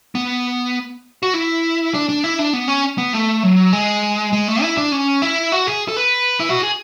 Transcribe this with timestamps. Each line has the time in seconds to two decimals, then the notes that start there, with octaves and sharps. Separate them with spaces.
0.15 B3
1.23 F#4
1.34 E4
1.94 D4
2.09 D4
2.24 E4
2.39 D4
2.53 B3
2.68 C#4
2.98 B3
3.13 A3
3.43 F#3
3.73 G#3
4.33 G#3
4.48 A3
4.62 E4
4.77 D4
4.92 C#4
5.22 E4
5.52 F#4
5.67 G#4
5.88 A4
5.97 B4
6.40 E4
6.50 F#4
6.61 G#4